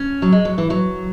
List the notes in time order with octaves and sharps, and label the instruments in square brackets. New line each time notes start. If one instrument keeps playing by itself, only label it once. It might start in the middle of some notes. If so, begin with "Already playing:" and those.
Already playing: [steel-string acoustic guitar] C#4
F#3
G#3
F#3
E3
F#3